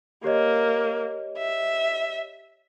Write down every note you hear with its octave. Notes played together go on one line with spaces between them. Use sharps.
A#3 G4 C#5 D#5
E5